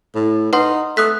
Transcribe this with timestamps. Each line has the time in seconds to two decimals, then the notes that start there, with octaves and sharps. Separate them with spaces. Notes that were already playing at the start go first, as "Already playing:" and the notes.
0.15 A2
0.53 D#4 B4 F#5 C6
0.97 A3 D#6 F#6 B6